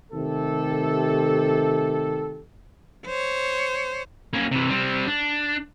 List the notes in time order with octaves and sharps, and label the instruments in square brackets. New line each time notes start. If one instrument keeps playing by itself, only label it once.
[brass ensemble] C3 D#3 A3 G4 A4
[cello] C5 C#5
[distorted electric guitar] A#3 C#4
C3 E3
G3 C4
D4